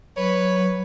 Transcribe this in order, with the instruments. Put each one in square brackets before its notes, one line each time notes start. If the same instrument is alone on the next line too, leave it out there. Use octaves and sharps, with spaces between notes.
[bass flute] F#3 [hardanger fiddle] B4 [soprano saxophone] C#5